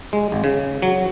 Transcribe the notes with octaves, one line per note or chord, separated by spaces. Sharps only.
G#3
G#1
C#3
F#3